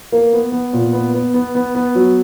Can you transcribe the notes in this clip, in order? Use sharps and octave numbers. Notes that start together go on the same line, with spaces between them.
A#3
B3
B3
A#2
B3
B3
B3
B3
B3
F#3